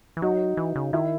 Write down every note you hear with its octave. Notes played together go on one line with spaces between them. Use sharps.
E3
F#3 D#4 F#4
E3
C#3
D#3 E4